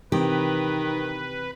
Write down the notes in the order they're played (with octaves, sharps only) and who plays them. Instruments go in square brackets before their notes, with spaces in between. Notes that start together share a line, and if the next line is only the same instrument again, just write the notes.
[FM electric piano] C3 E3 C4 [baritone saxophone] D#3 [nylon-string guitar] G4 [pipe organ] B4